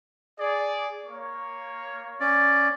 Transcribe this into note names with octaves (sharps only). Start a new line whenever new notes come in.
G#4 D5
A#3 C#5
C#4 D5